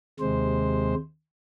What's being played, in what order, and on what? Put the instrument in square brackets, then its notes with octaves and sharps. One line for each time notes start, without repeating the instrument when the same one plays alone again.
[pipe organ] D#2 C3 G#3 C5